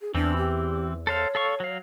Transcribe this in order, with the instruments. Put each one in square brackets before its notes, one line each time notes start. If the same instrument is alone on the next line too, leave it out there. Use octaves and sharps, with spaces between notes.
[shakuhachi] G#4
[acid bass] E2 [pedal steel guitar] E3 C4 [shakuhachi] D4
[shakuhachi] G4
[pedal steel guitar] A4 C5 F5 [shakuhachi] C#5
[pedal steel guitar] A4 F5 C#6
F#3 F5